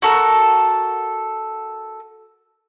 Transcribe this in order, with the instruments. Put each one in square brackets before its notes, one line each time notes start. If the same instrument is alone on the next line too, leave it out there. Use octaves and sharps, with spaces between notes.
[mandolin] F#4 A4 A#4